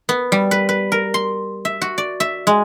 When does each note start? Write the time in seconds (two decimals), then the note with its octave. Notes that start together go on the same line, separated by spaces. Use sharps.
0.09 B3
0.32 G3
0.51 B4
0.69 B4
0.92 A#4
1.14 C6
1.65 E5
1.81 F#4
1.98 D5
2.20 E5
2.47 G#3